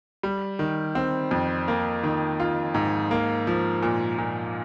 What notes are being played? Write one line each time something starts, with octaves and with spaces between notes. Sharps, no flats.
G3
D#3
C4
F2
A#3
D#3
F4
G#2
A#3
F3
A#2
A#2